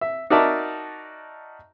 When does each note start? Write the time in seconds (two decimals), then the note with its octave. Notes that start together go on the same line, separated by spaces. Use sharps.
0.01 E5
0.30 D#4 F#4 A#4 D5 E5 A5